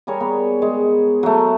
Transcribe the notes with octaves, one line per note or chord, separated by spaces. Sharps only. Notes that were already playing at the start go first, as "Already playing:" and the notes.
G3 G#4 A#4 C#5
B3
G#3
F#3 A3